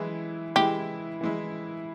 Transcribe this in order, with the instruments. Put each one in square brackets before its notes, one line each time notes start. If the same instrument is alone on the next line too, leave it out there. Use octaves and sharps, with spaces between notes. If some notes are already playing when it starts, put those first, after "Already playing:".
Already playing: [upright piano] E3 G#3 E4
[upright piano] E3 G#3 E4 [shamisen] G4
[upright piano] E3 G#3 E4